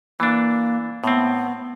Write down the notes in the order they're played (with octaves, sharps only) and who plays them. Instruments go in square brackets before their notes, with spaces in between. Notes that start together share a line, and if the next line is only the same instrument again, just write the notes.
[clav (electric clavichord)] E3 D4 [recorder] A#3
[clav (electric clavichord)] A2 C4 [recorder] B3